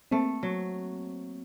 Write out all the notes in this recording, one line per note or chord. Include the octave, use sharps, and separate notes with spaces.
A3 A#3 C4
F#3